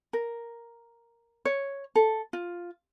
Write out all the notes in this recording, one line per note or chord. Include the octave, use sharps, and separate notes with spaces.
A#4
C#5
A4
F4